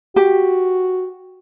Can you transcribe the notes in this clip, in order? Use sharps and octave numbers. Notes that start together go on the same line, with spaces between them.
F#4 G4